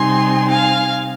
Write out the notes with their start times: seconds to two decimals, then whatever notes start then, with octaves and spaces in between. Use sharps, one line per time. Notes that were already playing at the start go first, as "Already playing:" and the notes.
Already playing: C3 G3 C4 D#4 G#5 C6
0.50 F5 G#5